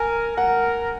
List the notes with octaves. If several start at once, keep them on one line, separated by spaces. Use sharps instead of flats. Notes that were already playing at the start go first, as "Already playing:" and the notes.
Already playing: A#4 G#5
A#4 F#5